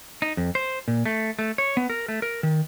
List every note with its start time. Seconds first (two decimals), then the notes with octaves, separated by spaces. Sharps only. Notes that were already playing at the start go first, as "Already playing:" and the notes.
0.22 D#4
0.37 F2
0.55 C5
0.88 A#2
1.06 A3
1.39 A3
1.58 C#5
1.77 B3
1.90 A#4
2.08 A3
2.22 A#4
2.43 D#3